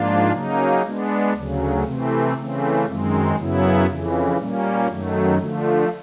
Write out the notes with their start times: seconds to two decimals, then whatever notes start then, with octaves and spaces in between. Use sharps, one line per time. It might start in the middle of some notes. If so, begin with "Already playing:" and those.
Already playing: G#2 F3 A#3 D4 F4
0.31 C#3 F#3 A#3 D#4
0.82 G#3 B3 D4
1.33 D2 C#3 F#3
1.84 C3 E3 A3 C4
2.35 C#3 E3 A3 C4
2.85 F#2 D#3 G#3 C4
3.36 F#2 C#3 F#3 B3 E4
3.86 F2 C#3 E3
4.37 A#2 G3 A#3 C#4
4.87 F#2 D#3 F#3 A3
5.38 D3 F3 A3